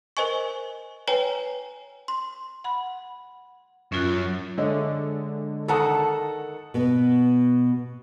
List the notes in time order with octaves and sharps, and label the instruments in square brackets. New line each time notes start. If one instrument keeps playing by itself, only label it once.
[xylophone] A#4 C5 D#5 G#5 C#6
B4 C#5 G5 G#5 A#5
C6
[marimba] F#5 B5
[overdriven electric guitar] F#2 [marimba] C#4 F4 F#6
[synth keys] D3 G#3 [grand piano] C#5 D#5 E5
[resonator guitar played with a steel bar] D#3 A5 A#5 [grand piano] A4 F#5 D#6
[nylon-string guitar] B2 B3